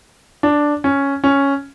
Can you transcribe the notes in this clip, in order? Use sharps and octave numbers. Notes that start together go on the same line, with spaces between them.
D4
C#4
C#4